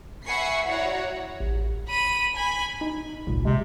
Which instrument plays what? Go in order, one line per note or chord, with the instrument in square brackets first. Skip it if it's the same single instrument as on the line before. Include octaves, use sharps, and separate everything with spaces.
[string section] E5 F#5 G#5 B5 C#6 C7
E4 F#4 C#5 D5 F#5 A#5
[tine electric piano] A1
[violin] B5 D#7
G#5 B5
[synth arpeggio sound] D#4
G#1 C#2 A#2
[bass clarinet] C3 [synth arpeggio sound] G#3